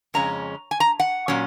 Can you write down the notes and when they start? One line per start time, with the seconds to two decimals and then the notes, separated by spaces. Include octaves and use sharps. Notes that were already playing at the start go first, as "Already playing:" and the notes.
0.14 F2 C#3 G#3 C#4 A#5
0.71 G#5
0.80 A#5
1.00 F#5
1.28 A#2 F#3 C#4